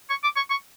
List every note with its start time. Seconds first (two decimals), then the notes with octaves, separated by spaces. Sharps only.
0.10 C#6
0.23 D6
0.36 C#6
0.50 C#6